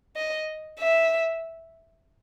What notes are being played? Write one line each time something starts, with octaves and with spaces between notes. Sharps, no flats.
D#5
E5